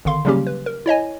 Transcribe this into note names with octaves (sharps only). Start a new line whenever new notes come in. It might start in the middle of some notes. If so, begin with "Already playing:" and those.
G#1 D3 D#3 F5 C6
C#3 F#3 G3 A#3 C#4 G4
B4
A#4
E4 C#5 D#5 G#5